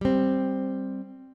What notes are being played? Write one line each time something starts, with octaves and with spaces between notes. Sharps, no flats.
G3 C4